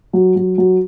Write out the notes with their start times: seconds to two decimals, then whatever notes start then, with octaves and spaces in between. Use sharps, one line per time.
0.13 F#3
0.36 F#3
0.58 F#3